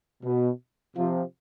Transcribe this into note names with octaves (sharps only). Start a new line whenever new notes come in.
B2
C3 F3 F4